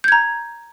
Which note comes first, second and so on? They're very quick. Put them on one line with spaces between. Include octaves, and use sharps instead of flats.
G6 G#6 A#5